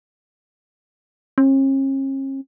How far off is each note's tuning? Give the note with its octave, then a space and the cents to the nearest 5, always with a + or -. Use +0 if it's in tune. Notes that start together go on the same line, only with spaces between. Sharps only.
C#4 -45